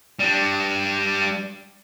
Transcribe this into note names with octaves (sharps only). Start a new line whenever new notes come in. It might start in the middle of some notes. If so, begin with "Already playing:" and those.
G3 D4